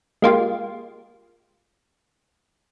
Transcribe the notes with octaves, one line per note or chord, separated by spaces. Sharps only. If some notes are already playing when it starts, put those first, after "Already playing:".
G#3 A#3 F4 G4